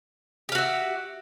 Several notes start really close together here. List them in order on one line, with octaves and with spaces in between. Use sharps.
G4 F5 F#4 E5